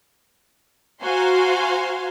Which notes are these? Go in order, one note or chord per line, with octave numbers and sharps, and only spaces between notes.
F#4 C5 F5 G#5 A#5 C6